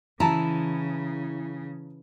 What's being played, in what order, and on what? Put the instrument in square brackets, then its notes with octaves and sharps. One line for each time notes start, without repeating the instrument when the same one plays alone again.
[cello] C#3 [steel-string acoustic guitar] E3 [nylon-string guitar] E4 [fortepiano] A5 A#5